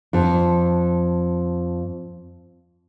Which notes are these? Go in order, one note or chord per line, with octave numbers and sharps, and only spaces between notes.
F2 A4